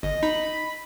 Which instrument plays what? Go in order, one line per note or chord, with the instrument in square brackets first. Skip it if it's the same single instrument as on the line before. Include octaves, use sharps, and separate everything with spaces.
[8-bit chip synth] G1 [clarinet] D#5
[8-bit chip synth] D#4 [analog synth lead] B5